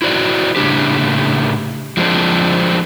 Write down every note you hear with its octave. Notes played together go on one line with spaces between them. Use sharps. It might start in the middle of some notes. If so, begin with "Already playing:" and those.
E4 F#4 C5 D5
A2 C#3 D4 G4
F3 G#3 B3 C4 D4